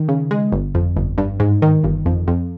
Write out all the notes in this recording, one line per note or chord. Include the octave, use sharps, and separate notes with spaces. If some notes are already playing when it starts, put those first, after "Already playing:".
Already playing: D#3
C#3
G#3
G1
F2
G1
G2
G#2
D#3
G1
F2
F2